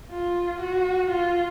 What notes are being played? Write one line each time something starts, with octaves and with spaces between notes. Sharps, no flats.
F4
F#4
F4